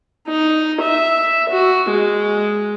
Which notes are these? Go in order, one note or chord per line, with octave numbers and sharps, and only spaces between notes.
D#4
E5
F#4
G#3